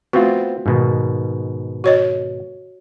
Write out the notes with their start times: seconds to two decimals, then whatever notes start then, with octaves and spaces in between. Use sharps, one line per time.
0.13 A3 B3 C4 F4 F#4
0.66 G#2 B2 D#3
1.84 F#4 C#5 D#5